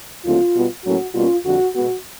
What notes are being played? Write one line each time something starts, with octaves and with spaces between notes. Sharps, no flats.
D#2 D3 F#3 A3 C4 F4
B2 G3 B3
A2 F#3 A#3 C#4 F#4
B2 G3 A#3 C#4 F4
F2 D3 G3 F#4
B2 G#3 B3 F#4